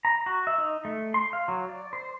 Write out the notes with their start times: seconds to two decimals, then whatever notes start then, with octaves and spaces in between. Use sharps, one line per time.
0.05 A#5
0.26 F#4
0.47 E5
0.58 D#4
0.85 A3
1.14 C6
1.33 F5
1.48 F#3
1.69 D5
1.93 C5